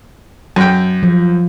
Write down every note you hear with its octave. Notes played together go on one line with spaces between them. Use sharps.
F#2 G5
F3